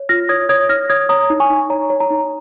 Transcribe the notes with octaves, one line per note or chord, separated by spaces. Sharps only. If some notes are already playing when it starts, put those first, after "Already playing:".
Already playing: C#5
F4 F6 A#6
C#5 D#6 G#6
C#5 D#6 G#6
C#5 F6 A#6
C#5 D#6 G#6
C#5 A#5 D#6
D#4
G#5 C#6
D#4
C#5 A#5
C#5
A#5
D#4